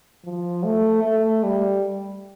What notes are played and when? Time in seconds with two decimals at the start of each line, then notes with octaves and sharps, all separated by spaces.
0.25 F3
0.65 A3
1.03 A3
1.43 G3